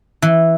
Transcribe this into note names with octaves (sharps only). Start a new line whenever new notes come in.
E3